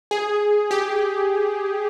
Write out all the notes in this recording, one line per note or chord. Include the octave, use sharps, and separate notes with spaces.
G#4
G4